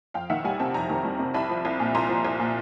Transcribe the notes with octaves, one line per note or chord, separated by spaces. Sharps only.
F2 F5 G5
D#3 E5 F#5
G3 F#5 G#5
C3 G5 A5
F2 G#5 A#5
D#3
G3
C3
C2 A5 B5
F3
C2
A#2
C2 A#5 C6
F3
C2
A#2